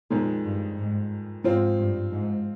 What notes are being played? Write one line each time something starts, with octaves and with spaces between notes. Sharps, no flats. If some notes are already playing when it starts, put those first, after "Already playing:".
F2 A#2 D#3 G#3
G2
G#2
G#2 F3 C4 F4
G2
G#2